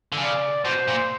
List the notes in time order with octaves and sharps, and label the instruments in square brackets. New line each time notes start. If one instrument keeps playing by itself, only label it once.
[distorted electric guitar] D3
[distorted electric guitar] C#3 [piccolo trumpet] D5
[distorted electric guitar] B2 [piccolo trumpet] C5
[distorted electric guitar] A#2